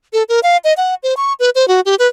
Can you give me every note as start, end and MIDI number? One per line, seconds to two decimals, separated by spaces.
0.13 0.23 69
0.29 0.40 70
0.43 0.57 77
0.64 0.73 75
0.77 0.94 78
1.03 1.14 72
1.17 1.33 85
1.39 1.50 71
1.55 1.68 72
1.68 1.81 66
1.85 1.95 67
1.99 2.07 71